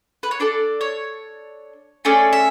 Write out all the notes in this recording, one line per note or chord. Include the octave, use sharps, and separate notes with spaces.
B4
C#5
D4 A4 D5
C#5
A3 C#4 G#4 D5
E5